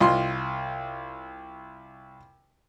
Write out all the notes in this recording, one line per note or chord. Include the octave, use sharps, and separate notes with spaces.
C2 F4 C6